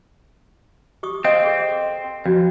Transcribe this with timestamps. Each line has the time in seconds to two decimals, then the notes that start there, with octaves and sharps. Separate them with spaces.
1.03 G4 C#6 D#6
1.25 C4 D#5 F5 D#6
1.44 G#4 A4
2.26 F2 F#4